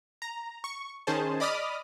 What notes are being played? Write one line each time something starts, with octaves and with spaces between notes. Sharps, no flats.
A#5
C#6
D#3 C#4 G#4 C5 A5
D5 D#5 B5 D6 D#6 F6